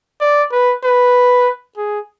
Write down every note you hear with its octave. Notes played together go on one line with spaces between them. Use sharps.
D5
B4
B4
G#4